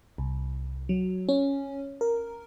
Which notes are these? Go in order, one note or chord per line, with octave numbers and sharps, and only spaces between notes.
C2
F#3
C#4
A#4